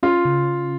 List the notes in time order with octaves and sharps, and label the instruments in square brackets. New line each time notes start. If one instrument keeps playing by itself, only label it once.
[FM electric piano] C#4 [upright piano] F4
[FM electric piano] C#3